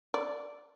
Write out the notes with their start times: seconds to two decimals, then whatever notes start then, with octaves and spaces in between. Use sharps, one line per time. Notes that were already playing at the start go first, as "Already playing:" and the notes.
0.14 D5